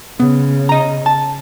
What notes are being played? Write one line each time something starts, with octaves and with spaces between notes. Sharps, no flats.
C#3 B3
D#5 A#5
A5